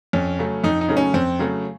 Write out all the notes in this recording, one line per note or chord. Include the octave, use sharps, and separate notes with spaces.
F2 C#4
C#3 F#3 A3
F2 D#4
D#4
C#3 F#3 A3
C#4
F2 C4
C#3 F#3 A3